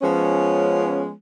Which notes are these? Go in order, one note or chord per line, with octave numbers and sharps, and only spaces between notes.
F3 G#3 B3 C#4